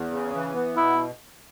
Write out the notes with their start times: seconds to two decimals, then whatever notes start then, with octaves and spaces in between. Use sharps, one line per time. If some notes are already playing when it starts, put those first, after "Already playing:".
Already playing: E2
0.11 C#3
0.33 E3
0.54 B3
0.77 B2 E4